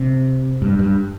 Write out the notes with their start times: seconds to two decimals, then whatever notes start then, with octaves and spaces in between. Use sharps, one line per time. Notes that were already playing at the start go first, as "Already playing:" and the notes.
Already playing: C3
0.62 G2
0.79 G2